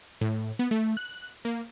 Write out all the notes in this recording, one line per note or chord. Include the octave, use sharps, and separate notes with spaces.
A2
B3
A3
F#6
A#3